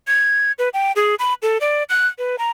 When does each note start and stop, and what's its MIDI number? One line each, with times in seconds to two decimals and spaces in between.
0.07 0.52 92
0.59 0.69 71
0.74 0.92 79
0.96 1.15 68
1.19 1.34 83
1.42 1.58 69
1.61 1.83 74
1.89 2.07 90
2.18 2.36 71
2.39 2.50 82